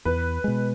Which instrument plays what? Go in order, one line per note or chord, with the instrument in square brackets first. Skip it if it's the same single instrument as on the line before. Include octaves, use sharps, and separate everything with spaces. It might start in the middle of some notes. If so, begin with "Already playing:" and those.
[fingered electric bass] E2 [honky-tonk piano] B4
[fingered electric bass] B2 G#3